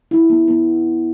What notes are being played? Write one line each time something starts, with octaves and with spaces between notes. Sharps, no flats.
E4
B3
B3